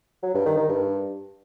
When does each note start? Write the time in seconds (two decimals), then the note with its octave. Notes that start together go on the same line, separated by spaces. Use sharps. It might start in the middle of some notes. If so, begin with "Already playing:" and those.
0.23 F#3
0.34 G2
0.46 D#3
0.57 D#3
0.69 G2